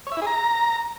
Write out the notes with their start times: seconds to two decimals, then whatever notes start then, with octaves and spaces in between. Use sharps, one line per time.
0.07 C#5
0.12 E5
0.17 E4
0.22 G#4
0.27 A#5